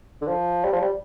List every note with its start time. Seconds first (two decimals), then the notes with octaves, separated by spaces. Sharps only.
0.21 D3
0.27 F3
0.64 G3
0.73 F3
0.81 G3